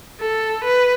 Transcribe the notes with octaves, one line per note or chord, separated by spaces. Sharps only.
A4
B4